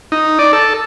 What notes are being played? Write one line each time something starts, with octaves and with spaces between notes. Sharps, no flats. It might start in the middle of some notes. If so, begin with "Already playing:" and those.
D#4
D5
A4